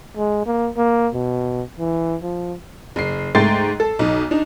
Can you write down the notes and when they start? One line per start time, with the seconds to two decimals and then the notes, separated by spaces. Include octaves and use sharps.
0.17 G#3
0.46 A#3
0.77 A#3
1.14 B2
1.79 E3
2.23 F3
2.96 F#1 C7
3.35 G#2 A3 G5 C6 A6 C7
3.80 A4
3.99 B1 D#4
4.31 D4 D#4